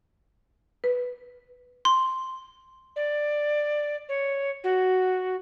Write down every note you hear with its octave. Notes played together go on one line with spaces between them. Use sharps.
B4
C6
D5
C#5
F#4